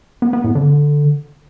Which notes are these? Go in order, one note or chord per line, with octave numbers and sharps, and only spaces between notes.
B3
B3
A2
D3